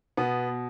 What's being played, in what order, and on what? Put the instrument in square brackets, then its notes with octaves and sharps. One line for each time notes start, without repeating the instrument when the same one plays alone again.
[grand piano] B2 B3